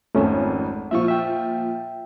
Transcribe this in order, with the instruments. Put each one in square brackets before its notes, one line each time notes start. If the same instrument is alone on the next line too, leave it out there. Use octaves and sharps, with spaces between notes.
[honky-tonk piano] G#1 F2 [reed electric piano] A3 C#4
[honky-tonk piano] A#2 F3 F4 [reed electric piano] E5 C#6
[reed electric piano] E5 G5